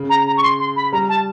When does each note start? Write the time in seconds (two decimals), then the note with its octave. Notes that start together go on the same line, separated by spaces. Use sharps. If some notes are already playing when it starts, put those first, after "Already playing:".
Already playing: C#3
0.09 A#5
0.26 A#5
0.37 C#6
0.43 C6
0.59 C6
0.76 B5
0.92 G3 A#5
1.09 A5